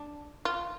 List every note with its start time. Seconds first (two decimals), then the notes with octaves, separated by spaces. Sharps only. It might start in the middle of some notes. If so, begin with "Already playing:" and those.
Already playing: D4
0.45 F4